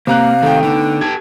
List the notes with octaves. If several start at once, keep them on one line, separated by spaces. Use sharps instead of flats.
C3 A#3 F5 A#5 F#6
D#3 A3 G5
D3 B3 D#4
G4 A4 G#6